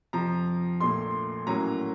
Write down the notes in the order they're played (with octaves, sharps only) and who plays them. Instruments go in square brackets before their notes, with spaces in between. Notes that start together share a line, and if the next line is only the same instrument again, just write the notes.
[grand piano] F2 C3 F3 A#5
A#1 A#2 A3 C6
A2 F#3 A#3 C#4 A#5